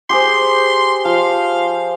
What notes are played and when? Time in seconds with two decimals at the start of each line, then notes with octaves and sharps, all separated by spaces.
0.10 G4 G#4 C5 C6
1.05 F3 F5